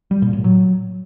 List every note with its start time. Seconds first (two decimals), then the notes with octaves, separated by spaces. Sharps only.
0.11 G3
0.22 A#2
0.33 A2
0.44 F#3